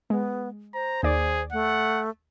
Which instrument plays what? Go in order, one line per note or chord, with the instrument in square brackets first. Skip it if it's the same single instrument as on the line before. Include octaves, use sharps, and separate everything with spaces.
[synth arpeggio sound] G#3 [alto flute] B3
[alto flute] C5 [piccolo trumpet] A#5
[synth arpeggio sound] D#2 D5 [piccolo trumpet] G#4
[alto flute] A3 [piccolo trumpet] F#5